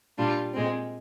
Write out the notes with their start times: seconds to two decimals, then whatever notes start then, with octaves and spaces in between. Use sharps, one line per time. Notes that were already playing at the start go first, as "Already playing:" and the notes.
0.17 A#2 G3 D4 F4
0.53 A#2 G#3 C4